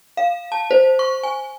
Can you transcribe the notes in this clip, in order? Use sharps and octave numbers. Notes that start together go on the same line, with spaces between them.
F5
A5
C5
C#6
G#5